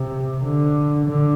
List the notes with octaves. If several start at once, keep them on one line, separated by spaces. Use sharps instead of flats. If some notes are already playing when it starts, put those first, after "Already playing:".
Already playing: C3
D3
D3